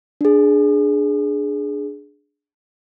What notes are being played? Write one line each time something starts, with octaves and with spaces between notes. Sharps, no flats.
D4 G#4